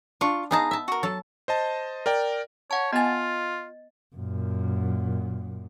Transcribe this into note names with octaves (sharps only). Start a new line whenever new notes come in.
D4 F4 C#6
B3 D#4 G#4 F5 A5 A#5
E5 A5
F#4 A#4
F#3 A4 A5
C5 D#5 A5
A#4 D5 G5
C#5 F#5 A5
B3 F4 D#5 G#5 A6
F#2 A#2